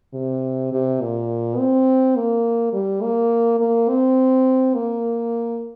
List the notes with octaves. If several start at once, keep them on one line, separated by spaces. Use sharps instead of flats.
C3
C3
A#2
C4
A#3
G3
A#3
A#3
C4
A#3